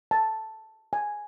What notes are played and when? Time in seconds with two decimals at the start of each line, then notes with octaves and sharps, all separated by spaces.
0.11 A5
0.93 G#5